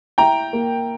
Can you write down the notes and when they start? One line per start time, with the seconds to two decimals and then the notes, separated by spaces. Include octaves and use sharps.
0.18 E4 G5 A#5
0.53 A#3